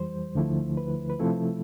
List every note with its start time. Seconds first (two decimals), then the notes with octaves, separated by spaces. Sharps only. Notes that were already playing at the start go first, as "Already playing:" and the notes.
Already playing: F2 E3 G3 C5
0.35 D2 D3 F3 A3 E4
0.77 B4
1.10 B4
1.20 C3 F3 A3 C4 E4 A4